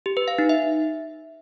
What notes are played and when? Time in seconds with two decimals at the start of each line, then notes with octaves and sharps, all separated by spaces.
0.06 G4
0.17 B4
0.28 F5
0.39 D#4
0.49 E5